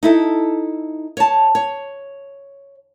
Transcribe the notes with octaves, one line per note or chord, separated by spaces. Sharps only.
D#4 E4 A4
C#5 A5
C#5